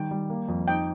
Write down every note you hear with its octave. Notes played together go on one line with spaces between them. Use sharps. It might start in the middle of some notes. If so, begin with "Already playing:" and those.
Already playing: D#3 G3 G5
G3
A#3
F2
D#4 G5